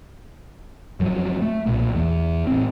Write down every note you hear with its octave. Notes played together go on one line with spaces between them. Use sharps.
F#1 F3 F#3
A3
B1 A#2
E2
A1 C4